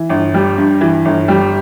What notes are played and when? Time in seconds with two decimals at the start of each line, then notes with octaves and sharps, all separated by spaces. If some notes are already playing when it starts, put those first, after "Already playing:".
Already playing: E3
0.09 G1
0.34 G3
0.58 G2
0.81 E3
1.05 G1
1.28 G3